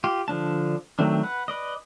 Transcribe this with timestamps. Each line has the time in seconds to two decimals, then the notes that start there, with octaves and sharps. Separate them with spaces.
0.04 F4 G4
0.28 D3 F3 D4 A5
0.99 D#3 F#3 A3 C4 D4
1.23 B4 F#5
1.48 B4 D5 D#5